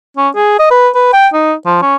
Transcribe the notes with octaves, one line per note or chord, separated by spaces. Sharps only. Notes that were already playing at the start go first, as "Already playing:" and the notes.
C#4
G#4
D#5
B4
B4
G5
D#4
F3
C#4